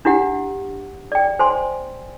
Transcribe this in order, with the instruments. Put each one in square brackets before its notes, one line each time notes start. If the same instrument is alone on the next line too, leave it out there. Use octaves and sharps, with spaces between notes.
[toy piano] D4 E4 G4 F#5
D5 G5
C5 G#5 C6